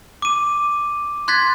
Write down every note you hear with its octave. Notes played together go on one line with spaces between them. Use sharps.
D6 D#7
C6 F#6 G#6 A6 B6